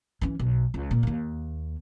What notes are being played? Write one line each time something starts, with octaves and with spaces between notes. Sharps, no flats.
E3 C#4
B1
C#2
A#2
D#2 A#3